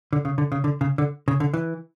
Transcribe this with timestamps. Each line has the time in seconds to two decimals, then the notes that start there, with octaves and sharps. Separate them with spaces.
0.13 D3
0.25 C#3
0.38 D3
0.52 C#3
0.64 D3
0.81 C#3
0.98 D3
1.28 C#3
1.40 D3
1.54 E3